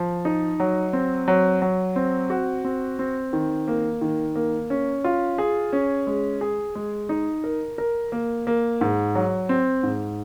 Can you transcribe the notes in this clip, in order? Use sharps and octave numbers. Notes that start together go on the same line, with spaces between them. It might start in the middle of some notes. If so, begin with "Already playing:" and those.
Already playing: F3
D#4
F#3
C4
F#3
F#3
C4
F#4
C4
C4
D#3
A#3
D#3
A#3
C#4
F4
G#4
C#4
G#3
G#4
G#3
D#4
A#4
A#4
A#3
A#3
G#2
F#3
C4
G#2